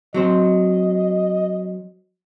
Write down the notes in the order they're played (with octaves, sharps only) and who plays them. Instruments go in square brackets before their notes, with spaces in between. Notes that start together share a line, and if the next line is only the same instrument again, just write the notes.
[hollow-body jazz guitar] F#3 C4 C5 [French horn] D#5